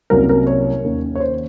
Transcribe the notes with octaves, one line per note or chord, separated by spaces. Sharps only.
C2 C3 F#3 A#3 C#4 A#4
A#4
C#5
D#2 D#3 A#3 C#4
C#5
C5